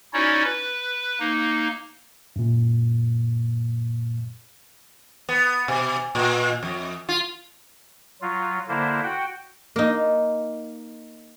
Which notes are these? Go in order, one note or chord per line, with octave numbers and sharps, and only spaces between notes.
C#4 D#4 E4 F#4 C#5 D5
B4
A#3 D#4
F#2 A#2
B3
B2
A#2
F2
F4
F#3 F4
D3 A#3 E4 C5
F#4 F#5 G5
A#3 D#4